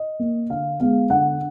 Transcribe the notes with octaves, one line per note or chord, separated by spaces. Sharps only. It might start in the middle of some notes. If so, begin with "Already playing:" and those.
Already playing: D#5
A#3
D3 F5
G#3 B3 F5
D3 F#5